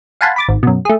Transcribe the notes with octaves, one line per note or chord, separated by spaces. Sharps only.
F5 F#5 G#5 A5 B5 C6
B5 D6 A6
G#1
F#2 B2
A3 G#4